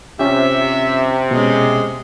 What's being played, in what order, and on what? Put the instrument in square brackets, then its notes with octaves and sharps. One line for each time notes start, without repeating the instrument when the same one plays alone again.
[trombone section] C3 [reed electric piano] C#4 F4 G4 [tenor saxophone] E5
[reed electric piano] B2 C#4 [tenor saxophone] G#3